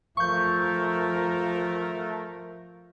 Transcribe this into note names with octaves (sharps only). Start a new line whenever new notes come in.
F3 A3 A#4 C#6 G6